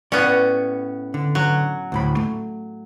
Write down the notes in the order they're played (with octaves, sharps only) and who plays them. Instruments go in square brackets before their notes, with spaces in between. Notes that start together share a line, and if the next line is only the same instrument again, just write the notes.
[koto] A2 B3 C#4 [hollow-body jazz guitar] D5
[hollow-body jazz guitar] D3
[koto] F#3
[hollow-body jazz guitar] D2 A2 B5
A3